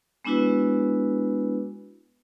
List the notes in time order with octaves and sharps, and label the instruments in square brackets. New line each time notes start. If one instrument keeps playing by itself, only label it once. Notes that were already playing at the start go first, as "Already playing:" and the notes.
[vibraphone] G#3 B3 D4 E4 F#4 B4